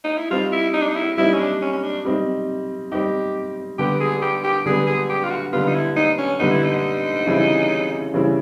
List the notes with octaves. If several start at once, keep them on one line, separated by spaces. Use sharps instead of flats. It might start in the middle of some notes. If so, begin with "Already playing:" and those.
D#4
E4
G3 C4 D#4 F4
E4
D#4
D4
D#4
E4
G3 C4 D#4 E4
C#4
D4
C#4
C#4
D4
G3 C4 D#4
G3 C4 D#4 G4
D3 G3 B3 G4
G#4
G4
G4
D3 G3 B3 G#4
G#4
G4
F4
F#4
D3 G3 B3 F4
D#4
E4
D#4
C#4
D3 G3 B3 D#4
E4
D#4
C#3 E3 G3 C4 E4
C#3 E3 G3 C4 E4